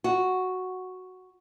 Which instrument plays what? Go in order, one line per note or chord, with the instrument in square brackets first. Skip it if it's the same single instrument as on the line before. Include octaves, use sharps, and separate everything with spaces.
[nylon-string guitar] F#4